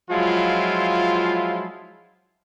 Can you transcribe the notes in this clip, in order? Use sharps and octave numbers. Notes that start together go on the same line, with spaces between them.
F3 F#3 G#3 E4 F4